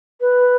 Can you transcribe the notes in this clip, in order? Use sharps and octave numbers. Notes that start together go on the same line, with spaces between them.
B4